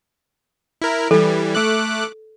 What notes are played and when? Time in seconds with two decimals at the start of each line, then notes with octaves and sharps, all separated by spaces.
0.82 E4 A#4
1.11 E3 G3 A4
1.55 A3 D6 F#6